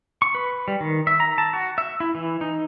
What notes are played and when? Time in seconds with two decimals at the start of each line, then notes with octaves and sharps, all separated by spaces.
0.22 C#6
0.35 B4
0.68 G3
0.80 D#3
1.07 E5
1.20 A#5
1.38 A5
1.53 F#4
1.78 E5
2.00 E4
2.15 E3
2.41 D#4